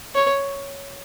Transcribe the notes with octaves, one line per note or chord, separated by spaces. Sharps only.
C#5